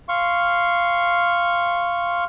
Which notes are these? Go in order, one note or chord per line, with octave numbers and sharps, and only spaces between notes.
F5 C6 C#6